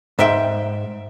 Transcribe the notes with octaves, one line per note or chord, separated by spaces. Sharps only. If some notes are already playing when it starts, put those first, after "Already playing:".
G#2 C5 E5 G5